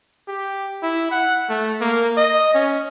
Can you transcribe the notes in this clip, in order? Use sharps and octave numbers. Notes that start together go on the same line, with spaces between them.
G4
E4
F#5
A3
A#3
D#5
C#4